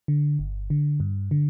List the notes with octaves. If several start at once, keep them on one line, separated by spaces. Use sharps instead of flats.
D3
G1
D3
G2
D3